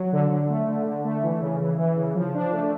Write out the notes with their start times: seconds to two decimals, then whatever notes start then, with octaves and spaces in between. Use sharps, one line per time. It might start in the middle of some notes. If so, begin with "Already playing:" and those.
Already playing: F#3
0.13 D3
0.31 D3
0.49 A3
0.68 D3
0.86 D3
1.04 A3
1.23 E3
1.41 C#3
1.61 E3
1.79 E3
1.97 C#3
2.15 F3
2.34 D4
2.53 A3